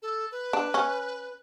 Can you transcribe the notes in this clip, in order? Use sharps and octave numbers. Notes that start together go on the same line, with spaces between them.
A4
B4
D4
C#4